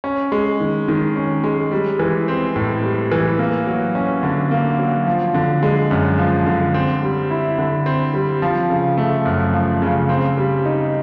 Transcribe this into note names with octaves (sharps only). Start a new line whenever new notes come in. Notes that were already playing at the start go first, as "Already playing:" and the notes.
C#4
G#3
D#3
D#3
C#4
G#3
G3
E3
C4
A2
G3
E3
A#3
F#3
C#4
D3
A#3
F#3
F3
D3
G#3
F#2
F3
D3
C4
G3
E4
D3
C4
G3
F3
C#3
A3
F#2
F3
C#3
C4
G3
D#4